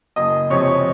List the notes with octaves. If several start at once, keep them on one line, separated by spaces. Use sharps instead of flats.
F#1 D#5 D#6
F2 C3 C#5 C#6